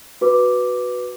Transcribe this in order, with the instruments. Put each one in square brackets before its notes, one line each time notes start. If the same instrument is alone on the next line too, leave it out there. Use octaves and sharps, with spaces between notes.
[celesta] F#4 B4 D6